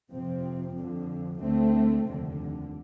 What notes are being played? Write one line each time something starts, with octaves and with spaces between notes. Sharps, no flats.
F2 C3 F3 C4
F2 D3 F3
D2 D3 A3 C4
F1 D#2 D3